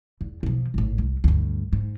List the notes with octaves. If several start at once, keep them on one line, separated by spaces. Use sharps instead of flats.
E2
B2 F3
G#1 A2
C2
D2 G2
G#2